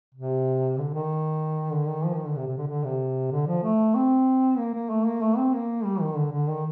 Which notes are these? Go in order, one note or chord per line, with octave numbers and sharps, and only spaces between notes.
C3
D3
D#3
D3
D#3
F3
D#3
D3
C3
C3
D3
D3
C3
D3
F3
A3
C4
A#3
A#3
A3
A#3
A3
C4
A#3
G3
D#3
D3
D3
D#3